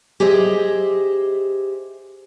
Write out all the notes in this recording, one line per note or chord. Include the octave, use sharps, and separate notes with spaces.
G4 G#4 C5 D#5 E5